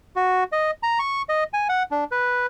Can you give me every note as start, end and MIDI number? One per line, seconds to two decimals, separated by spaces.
0.16 0.44 66
0.52 0.71 75
0.83 0.99 82
0.99 1.22 85
1.29 1.44 75
1.53 1.67 80
1.69 1.83 78
1.91 2.04 62
2.11 2.46 71